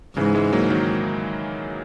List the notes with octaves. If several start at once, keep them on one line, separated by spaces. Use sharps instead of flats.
G#2 C#3 E3
E3 G#3
F#3 A#3
D#3 F#3